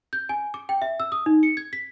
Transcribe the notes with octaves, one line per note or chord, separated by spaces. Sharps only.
G6
G#5
D6
G5
E5
E6
D#6
D#4
C#7
G#6
B6